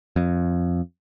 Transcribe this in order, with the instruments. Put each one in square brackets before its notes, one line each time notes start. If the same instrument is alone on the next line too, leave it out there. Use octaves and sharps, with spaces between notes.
[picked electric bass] F2